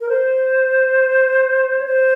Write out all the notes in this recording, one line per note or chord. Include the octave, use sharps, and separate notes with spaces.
A#4
C5
C#5
C5